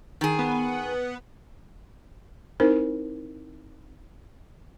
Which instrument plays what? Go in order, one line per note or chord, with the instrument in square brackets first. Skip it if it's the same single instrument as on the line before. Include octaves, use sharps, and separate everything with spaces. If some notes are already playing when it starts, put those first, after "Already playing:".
[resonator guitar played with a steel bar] D#3 G#4
[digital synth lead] B3
[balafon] C4 D#4 E4 A#4 C5